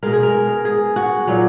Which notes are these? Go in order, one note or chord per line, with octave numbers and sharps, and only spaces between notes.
B2 G#3 A#4
G#4
A#4
G#4
F#4
A#2 F#3